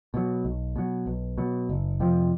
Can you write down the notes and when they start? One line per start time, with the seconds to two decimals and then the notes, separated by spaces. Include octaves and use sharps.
0.14 B2 F#3
0.44 B1
0.76 B2 F#3
1.06 B1
1.38 B2 F#3
1.69 F#1
2.00 F2 C3 F3